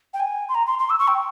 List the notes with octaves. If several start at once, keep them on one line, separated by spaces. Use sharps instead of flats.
G5
G#5
C6
A#5
C6
C6
E6
C#6
G5